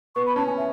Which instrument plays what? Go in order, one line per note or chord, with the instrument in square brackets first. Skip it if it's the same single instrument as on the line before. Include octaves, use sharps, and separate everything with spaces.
[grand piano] B3 [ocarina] C#6
[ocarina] B5
[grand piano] C#4 [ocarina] A5
[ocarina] G#5
E5